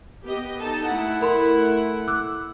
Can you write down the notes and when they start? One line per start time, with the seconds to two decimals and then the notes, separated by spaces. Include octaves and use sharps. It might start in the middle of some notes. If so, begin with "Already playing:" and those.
0.24 B3 G4 D#5
0.60 D#4 A4 A5
0.89 A3 E4 F#5
1.21 A#4 B5 C6
2.08 D6 E6 F#6